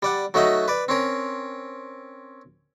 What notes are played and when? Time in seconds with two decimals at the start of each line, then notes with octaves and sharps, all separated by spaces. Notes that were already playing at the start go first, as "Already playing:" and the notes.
0.03 G3 D5 F#5
0.34 F#3 A3 D#4 F#4 D#5 E5
0.68 B4 D5
0.88 C4 C#4 A#4